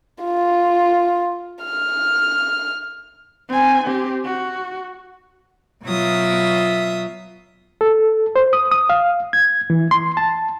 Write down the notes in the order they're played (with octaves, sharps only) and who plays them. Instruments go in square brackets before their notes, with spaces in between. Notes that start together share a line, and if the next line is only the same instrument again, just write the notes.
[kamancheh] F4
F6
[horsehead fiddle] C4 G#5
C4 G4
F#4
[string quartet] B2 F#3 F4 E5 D#6
[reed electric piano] A4
C5
D#6
D#6
F5
G#6
E3
C6
A5